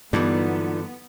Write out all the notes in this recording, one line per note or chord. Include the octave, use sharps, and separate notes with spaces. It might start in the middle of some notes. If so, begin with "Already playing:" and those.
G2 D3 E3 F#3 B3 D#4 F4 D5